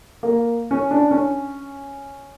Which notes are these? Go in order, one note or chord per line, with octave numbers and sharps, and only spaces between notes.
A#3
C#4
D4
C#4